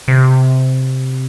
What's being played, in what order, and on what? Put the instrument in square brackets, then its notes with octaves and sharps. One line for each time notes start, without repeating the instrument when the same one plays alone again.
[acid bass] C3